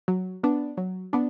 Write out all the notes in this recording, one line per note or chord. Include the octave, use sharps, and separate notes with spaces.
F#3
B3 D4
F#3
B3 D4